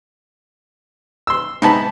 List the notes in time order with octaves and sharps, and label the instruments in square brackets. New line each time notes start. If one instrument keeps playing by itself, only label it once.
[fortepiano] C6 E6
[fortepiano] G#2 B3 B5 [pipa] C3 D#4 A5